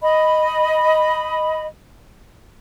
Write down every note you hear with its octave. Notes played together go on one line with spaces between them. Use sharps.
D#5 B5